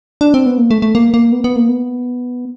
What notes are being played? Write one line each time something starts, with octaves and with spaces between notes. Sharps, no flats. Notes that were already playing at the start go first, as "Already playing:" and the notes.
D4
C4
B3
A#3
A3
A3
A#3
A#3
B3
B3
A#3
B3